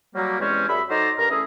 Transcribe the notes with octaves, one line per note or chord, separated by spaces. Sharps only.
F#3 G3 A#3
E2 G3 G#3 C4 C#4
F#2 G3 G#4 E5 B5
F#3 D#4 A4 C5 D5 A#5
G2 A#4 A#5
E3 A3 C#4 E4 G#4